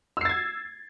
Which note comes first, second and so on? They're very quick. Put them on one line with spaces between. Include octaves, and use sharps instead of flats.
E6 C7 A6 G#6